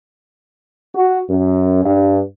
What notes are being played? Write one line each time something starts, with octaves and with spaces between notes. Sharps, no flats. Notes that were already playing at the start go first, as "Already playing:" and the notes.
F#4
F#2
G2